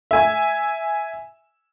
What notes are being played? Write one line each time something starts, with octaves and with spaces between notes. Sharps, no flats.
E5 G#5